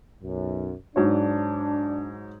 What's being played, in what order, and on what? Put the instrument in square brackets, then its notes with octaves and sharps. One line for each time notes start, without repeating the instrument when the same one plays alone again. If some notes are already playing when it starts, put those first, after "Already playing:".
[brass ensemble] B1 F#2
[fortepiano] G#2 F#3 C#5 [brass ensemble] D4